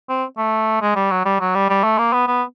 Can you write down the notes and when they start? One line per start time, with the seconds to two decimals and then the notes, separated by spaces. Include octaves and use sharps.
0.09 C4
0.38 A3
0.81 G#3
0.96 G3
1.11 F#3
1.25 G3
1.40 F#3
1.55 G3
1.70 G3
1.84 A3
1.98 A#3
2.13 B3
2.27 B3